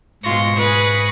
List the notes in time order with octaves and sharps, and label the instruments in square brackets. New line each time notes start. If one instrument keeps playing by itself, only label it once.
[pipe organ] G#2 C#6 A#6 [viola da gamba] B2 G#3 F4
[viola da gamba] G#4 B4